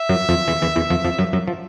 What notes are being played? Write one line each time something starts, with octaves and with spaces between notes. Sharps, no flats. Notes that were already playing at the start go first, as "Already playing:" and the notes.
Already playing: E5
F#2 F#3
F2 F3
E2 E3
E2 E3
E2 E3
F2 F3
F2 F3
F#2 F#3
F#2 F#3
F3